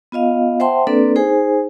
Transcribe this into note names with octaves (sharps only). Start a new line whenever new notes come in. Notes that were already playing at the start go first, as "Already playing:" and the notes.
B3 F4 D#5 F5
C5 E5 F#5 G5 A5 C6
A#3 C4 D4 A4 B4 D5
D#4 G#4 C5 G#5